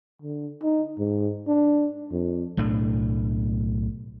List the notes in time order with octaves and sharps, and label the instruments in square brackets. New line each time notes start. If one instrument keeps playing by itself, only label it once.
[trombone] D3
D#4
G#2
D4
F2
[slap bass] B1 A2 A3 D4